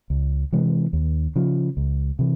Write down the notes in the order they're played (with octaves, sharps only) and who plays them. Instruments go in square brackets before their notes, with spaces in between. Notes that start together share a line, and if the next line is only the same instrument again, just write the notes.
[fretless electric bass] C#2
C3 E3 G#3
D#2
C#3 F3
C#2
C3 E3